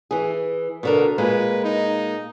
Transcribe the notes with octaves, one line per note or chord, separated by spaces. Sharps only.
E3 G#4
B2 D3 A#4
A#2 G#3 A#3 B4
D#4